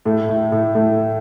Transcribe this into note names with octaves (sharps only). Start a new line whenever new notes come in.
A2 A3
A2 A3
A2 A3
A2 A3